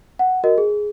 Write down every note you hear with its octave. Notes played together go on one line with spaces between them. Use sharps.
F#5
F#4 A#4 D#5
G#4